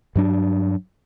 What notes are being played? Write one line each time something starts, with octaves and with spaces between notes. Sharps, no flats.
G2 F#3 D4